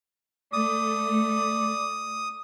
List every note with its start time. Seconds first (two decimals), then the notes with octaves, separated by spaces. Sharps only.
0.53 A3 D5 D#6